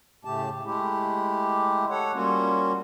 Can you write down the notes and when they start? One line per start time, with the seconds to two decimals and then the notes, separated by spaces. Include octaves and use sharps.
0.25 A2 C#3 A3 G4 A5
0.65 G#3 A3 E4 G4
1.89 A4 C#5 F#5
2.14 G3 A#3 C#4 F4 F#4